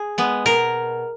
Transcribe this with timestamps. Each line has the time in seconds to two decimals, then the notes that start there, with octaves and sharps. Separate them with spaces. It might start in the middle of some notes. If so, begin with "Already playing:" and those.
Already playing: G#4
0.18 G#3 B3
0.46 B2 A#4